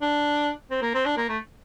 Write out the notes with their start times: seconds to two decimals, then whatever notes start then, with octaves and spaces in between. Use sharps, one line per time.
0.02 D4
0.71 C4
0.82 A#3
0.94 C4
1.06 D4
1.17 A#3
1.29 A3